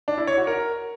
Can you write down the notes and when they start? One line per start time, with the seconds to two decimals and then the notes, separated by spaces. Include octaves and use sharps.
0.08 D4
0.18 E4
0.27 C#5
0.37 F#4
0.47 A#4